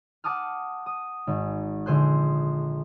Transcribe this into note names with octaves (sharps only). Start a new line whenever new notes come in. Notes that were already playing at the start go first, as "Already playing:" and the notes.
F#5 A5 D6 D#6 F6
D#6
G#1
A#1 D3 G#4 C5 C6 F#6